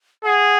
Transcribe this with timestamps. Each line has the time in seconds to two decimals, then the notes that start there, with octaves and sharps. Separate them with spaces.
0.25 G#4 F#5